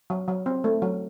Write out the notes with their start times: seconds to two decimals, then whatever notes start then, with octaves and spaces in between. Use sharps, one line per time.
0.10 F#3
0.28 F#3
0.46 C4
0.64 A3
0.82 F#3